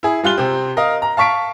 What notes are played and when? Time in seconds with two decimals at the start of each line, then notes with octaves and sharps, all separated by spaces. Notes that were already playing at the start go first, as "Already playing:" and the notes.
0.03 E4 G#4
0.23 G3 F4 F#6 G7
0.37 C3 C4
0.77 A#4 D#5 F5
1.02 A#5
1.17 F5 A5 C#6 B6 D7